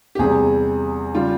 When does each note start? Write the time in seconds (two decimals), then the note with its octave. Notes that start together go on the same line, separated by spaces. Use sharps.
0.15 G4
0.19 E2 C3 G3 G#4
1.15 C#3 G3 F4